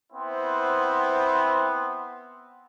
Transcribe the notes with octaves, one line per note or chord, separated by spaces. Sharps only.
B3 C4 E4 C5